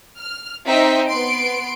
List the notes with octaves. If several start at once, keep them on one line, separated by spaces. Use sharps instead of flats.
F6
C4 D#4 C5 D#5 E5 G5
B3 C6 D7